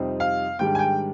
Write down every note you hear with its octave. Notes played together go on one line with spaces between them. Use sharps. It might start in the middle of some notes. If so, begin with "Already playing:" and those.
Already playing: F2 C3 G3 C4 D#4
F5
G#2 D#3 G3 D4 G5
G#5
G5